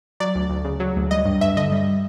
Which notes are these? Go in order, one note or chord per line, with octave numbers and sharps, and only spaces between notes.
F#3 D5
D2
D2
C#3
F#3
D2
G3 D#5
G2
G2 E5
D3 D#5
G3